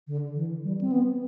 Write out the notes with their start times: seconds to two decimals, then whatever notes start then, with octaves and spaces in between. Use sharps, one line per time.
0.07 D3
0.36 E3
0.64 G3
0.81 C4
0.92 B3